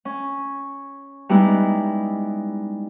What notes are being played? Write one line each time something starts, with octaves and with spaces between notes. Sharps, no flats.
C#4
G3 G#3 B3 D#4 E4